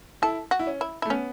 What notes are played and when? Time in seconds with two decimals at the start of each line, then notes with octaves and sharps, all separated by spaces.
0.22 E4 A4
0.51 F#4
0.59 E4
0.67 C#4
0.81 E4
1.02 E4
1.05 A3
1.10 B3 C#4